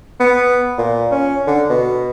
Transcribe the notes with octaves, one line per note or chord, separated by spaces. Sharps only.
B3
A#2
C#4
D3
B2